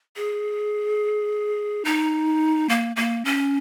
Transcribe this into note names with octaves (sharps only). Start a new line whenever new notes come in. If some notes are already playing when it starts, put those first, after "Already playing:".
G#4
D#4
A#3
A#3
C#4